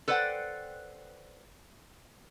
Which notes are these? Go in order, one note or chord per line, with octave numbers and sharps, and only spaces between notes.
A4 B4 C5 D5 F#5 G5